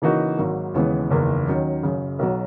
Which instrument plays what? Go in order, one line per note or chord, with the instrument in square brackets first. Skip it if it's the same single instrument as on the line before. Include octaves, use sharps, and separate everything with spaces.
[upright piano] C#3 E3 A#3 D#4 F#4
G#1 G#2 F#3 A#3
D#2 C#3 E3 G#3 B3
F#1 E2 D#3 A#3
D#2 D#3 F#3 C#4
F#1 F#2 C#3
B1 B2 F#3